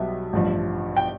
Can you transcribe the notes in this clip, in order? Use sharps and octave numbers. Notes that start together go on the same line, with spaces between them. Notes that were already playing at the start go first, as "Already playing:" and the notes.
Already playing: B1 B2 G3 B3 E5
A1 G2 F3
G5